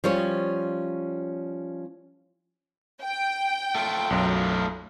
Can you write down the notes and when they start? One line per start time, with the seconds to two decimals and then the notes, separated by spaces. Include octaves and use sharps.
0.04 F3 G3 C#4 C#5
3.03 G5
3.75 A3 F4
4.10 B1 F#2